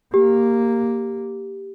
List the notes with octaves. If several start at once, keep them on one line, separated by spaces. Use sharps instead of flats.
A#3 G4